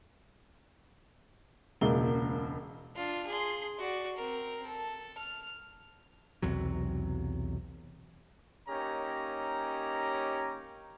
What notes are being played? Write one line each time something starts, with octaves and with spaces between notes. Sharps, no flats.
E1 C#2 A#3 G7
D4 F4
G#4 C6
F#4 D5
C4 A#4
A4
F6
B1 E2 C3 F#3
A#3 C#4 D#4 G4 C#5 A#5